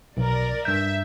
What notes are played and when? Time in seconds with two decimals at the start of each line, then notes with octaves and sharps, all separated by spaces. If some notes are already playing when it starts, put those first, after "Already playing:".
0.17 B1 A#4 D5
0.65 G2 E5 G6